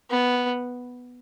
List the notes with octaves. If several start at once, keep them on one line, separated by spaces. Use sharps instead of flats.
B3